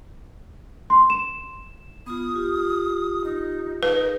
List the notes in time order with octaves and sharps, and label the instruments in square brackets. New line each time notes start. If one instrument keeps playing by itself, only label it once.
[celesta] C6
E7
[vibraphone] B3 F4 [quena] D#6
[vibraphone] F4 G4
[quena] D#4
[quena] D#4 [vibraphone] G#4 A#4 [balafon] B4